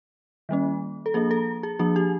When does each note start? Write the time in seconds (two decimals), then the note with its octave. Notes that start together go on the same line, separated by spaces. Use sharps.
0.49 D#3 G3 A#3 C#4
1.06 A4
1.14 F3 A#3 D4 G#4
1.31 A4
1.63 G#4
1.79 F3 A#3 D4 G#4
1.96 G4